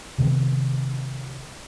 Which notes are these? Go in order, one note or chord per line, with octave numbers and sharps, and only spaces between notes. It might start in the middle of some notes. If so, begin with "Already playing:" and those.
C3 D#3 F3 B3